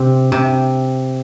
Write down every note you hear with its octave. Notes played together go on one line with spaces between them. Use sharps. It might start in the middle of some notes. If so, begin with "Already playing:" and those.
Already playing: C3
C3